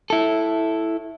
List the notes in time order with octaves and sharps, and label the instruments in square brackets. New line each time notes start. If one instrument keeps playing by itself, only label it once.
[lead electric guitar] E4 A4